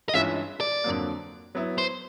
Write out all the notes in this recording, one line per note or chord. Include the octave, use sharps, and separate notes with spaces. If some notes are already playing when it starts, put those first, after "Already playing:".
D#5
G2 E3 G#3 C#4 F4 E5
D5
F2 D3 F#3 A#3
F#3 B3 E4
C5